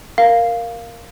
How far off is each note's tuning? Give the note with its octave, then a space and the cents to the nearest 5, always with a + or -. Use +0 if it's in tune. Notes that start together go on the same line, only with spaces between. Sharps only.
A#4 +0 F5 +0